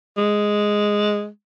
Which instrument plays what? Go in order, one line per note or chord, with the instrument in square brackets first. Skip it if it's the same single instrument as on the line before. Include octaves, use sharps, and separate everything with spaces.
[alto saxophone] G#3